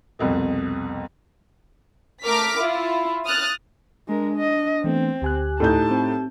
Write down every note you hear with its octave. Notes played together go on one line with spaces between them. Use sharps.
C2 F2 B2
A3 A#4 D6 F6 B6
E4 F4
D#6 F6 F#6 A6
G#3 D4 A#4
D#5
E3 A3 B3 C4
D2 G4 G#5 F#6
A2 D#4 A5 G6
C4